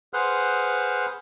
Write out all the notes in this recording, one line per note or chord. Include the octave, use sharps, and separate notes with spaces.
G#4 B4 C5 F#5 C6 F6